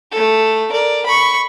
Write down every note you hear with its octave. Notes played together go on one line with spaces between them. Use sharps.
A3 A4
A#4 D5
B5 C#6